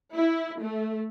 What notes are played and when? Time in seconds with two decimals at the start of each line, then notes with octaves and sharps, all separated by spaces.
0.15 E4
0.60 A3